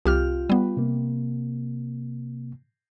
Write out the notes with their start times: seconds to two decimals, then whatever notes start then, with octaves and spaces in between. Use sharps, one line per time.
0.06 C2 F4 G4 F6
0.50 G3 B3
0.77 C3 A#3